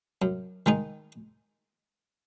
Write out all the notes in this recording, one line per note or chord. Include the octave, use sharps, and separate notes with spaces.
F#2
D#3 G#3 D#4